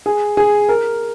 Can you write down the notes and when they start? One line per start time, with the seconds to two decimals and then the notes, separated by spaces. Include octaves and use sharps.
0.06 G#4
0.37 G#4
0.69 A#4